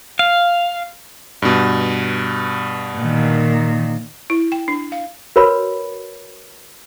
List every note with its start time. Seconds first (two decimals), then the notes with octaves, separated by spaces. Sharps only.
0.19 F5
1.42 G2 B2
2.98 A#2 D#3
4.30 E4
4.52 G5
4.68 D4
4.92 F5
5.36 F#4 A#4 B4 C#5 B5